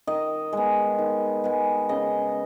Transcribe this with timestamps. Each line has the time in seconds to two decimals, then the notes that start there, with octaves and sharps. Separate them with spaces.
0.07 D#3 D#5
0.53 G#3 B3
0.99 D#3
1.44 G#3 B3
1.89 C#3 D#5